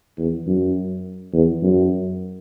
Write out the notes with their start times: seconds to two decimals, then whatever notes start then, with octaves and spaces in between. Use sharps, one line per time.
0.18 E2
0.47 F#2
1.33 E2
1.62 F#2